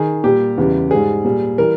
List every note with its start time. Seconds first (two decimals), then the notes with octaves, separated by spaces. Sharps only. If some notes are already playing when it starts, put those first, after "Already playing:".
Already playing: D#3 G#4
0.24 A#2 G3 G4
0.58 E2 C#3 E3 G3
0.91 G#2 G3 G#4
1.25 A#2 G3
1.58 E3 G3 A#4